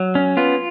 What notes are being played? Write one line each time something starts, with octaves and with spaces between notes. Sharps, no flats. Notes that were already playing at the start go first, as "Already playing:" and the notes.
Already playing: F#3
C#4
B3 F4